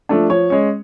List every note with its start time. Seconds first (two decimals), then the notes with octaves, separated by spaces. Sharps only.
0.09 F3 A3 D4
0.30 F3 C#5
0.50 G#3 C#4